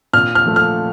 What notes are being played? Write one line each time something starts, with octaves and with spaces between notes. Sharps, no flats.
A#2 F6
F6
F3 A3
F6